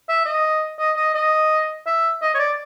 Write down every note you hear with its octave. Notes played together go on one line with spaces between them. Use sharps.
E5
D#5
D#5
D#5
D#5
E5
D#5
C#5
D5